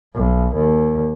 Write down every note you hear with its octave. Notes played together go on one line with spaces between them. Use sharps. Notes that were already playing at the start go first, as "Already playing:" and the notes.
B1
D#2